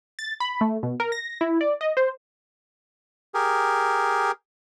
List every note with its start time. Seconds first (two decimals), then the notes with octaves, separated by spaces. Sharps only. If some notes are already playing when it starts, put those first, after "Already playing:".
0.19 A6
0.40 B5
0.61 A3
0.83 B2
1.00 A#4
1.12 A#6
1.41 E4
1.61 D5
1.81 D#5
1.97 C5
3.34 G4 G#4 A#4